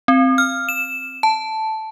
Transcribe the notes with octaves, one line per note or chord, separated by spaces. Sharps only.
C4
F6
E7
A5